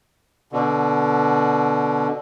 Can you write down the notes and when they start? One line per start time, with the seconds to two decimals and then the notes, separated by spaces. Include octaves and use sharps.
0.52 B2 D3